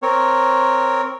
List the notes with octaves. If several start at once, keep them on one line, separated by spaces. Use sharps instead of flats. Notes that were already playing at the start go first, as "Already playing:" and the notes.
C4 A#4 C#5